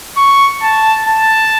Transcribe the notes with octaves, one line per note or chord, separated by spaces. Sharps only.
C#6
A5
A5